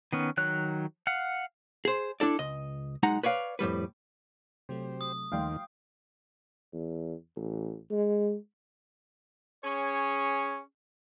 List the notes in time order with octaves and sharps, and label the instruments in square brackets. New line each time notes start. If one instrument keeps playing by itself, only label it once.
[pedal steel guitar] D#3 B3 C#4
D#3 F#3 C#5 F#6
F5 F#5
[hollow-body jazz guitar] G#4 C5
D4 E4 A4 D5
C#2 D#5
B1 G#3 D#4 F#5 A#5
B4 C#5 D5 F5
F2 A2 G3 B4
[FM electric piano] C3 F#3 A3 [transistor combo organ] G4 C5
[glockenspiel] D#6
[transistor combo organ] D#2 D#3 [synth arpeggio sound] F3 G3 A3 [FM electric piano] F5 G5 C6
[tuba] E2
A1
G#3
[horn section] C#4 G#4 C#5